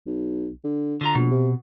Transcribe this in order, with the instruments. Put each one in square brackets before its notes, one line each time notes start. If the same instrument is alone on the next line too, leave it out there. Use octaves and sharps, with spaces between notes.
[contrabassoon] B1
D3
[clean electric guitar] D3 F4 A#5
[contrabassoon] A#1 [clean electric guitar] B2
[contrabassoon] C3